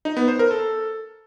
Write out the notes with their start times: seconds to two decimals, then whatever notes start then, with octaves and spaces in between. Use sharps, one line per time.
0.05 D#4
0.17 B3
0.28 C5
0.39 A#4
0.51 A4